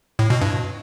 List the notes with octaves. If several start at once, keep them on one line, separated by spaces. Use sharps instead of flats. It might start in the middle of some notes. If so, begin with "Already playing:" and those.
A2
B2
G2